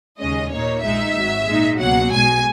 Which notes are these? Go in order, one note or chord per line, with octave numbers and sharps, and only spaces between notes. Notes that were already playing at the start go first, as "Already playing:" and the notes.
D#2 C#3 G#3 C#4 D#5
A#2 A#3 D#4 C#5
A#1 A#2 G#3 D#4 E5
G#1 G#2 F#3
A#2 G#3 D#4
C#2 B2 F#3 A#3 F#5
B1 B2 G#3 G#5